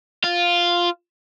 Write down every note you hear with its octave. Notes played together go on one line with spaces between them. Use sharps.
F4